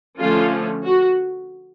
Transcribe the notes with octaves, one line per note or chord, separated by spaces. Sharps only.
D3 F3 A3 C#4 F4
F#4